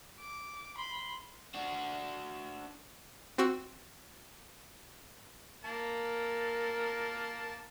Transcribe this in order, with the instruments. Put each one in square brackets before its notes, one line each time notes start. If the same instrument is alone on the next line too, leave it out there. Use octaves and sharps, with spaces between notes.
[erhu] D6
[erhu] B5 [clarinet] C6
[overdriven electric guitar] D4 F#4
[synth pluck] C4 F#4 E6
[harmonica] A#3 A#4 A5